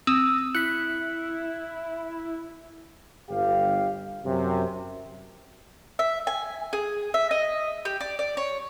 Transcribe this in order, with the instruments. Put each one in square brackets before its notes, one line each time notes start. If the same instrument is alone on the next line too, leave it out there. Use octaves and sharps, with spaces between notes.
[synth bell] C4 [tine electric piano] D#6 E6
[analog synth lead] E4 [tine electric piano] F#6 [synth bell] B6 C#7
[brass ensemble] G1 G4 F5
F#2 C3
[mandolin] E5
G#5
G#4
E5
D#5
G4
D5
D5
C#5